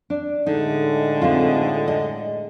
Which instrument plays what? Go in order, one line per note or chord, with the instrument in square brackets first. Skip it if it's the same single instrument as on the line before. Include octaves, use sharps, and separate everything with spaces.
[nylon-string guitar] D4
[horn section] A2 G#3 [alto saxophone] D3 [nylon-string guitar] D#4
[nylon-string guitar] C4 D#4 F4
D#5